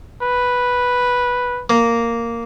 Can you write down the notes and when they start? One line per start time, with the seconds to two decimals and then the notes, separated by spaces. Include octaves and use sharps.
0.22 B4
1.70 A#3